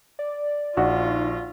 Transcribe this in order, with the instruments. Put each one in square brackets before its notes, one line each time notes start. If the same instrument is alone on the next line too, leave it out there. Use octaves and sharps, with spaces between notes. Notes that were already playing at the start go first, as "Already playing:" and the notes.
[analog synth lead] D5
[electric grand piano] A#1 F#4 [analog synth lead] D#4 [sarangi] F4 [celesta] D5 F#5